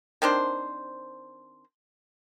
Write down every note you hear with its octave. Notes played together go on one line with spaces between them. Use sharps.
D#3 C4 D4 C5